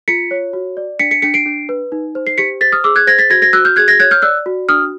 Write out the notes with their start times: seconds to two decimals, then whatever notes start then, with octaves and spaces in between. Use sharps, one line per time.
0.08 F4 B6 C#7
0.31 C#5
0.53 F#4
0.77 D5
0.99 D4 B6 C#7
1.11 B6 C#7
1.22 D4 B6 C#7
1.34 C7 D7
1.46 D4
1.69 B4
1.92 D#4
2.15 C5
2.27 C7
2.38 G4 B6 C#7
2.61 C5 A6 B6
2.72 D#6 F6
2.84 G#4 D6 E6
2.96 F#6 G#6
3.07 C5 G#6 A#6
3.18 A6 B6
3.30 F#4 G#6 A#6
3.42 G#6 A#6
3.53 F#4 E6 F#6
3.65 F6 G6
3.76 G#4 F#6 G#6
3.88 G#6 A#6
3.99 C#5 F#6 G#6
4.11 F6 G6
4.22 D5 E6 F#6
4.46 F#4
4.69 D4 D#6 F6